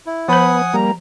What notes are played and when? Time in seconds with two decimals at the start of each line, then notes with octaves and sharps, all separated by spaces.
0.06 E4
0.28 F3 B3 C5 F#5 G#5 B5 D#6
0.73 G3 A#3 A#5